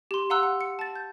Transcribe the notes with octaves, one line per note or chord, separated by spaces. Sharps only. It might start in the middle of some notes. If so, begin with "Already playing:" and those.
G4 C6
F5 F#5 A#5 C6 E6 F#6
F#5
C#7
A5 A6
G6